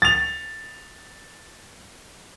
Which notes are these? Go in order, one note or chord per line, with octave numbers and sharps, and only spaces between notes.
A6 F7